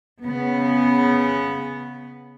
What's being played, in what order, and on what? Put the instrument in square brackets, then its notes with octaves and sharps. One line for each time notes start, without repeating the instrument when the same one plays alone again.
[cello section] C#3 B3